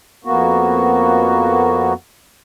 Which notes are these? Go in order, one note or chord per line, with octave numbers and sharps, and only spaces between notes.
F2 A#3 B3 F#4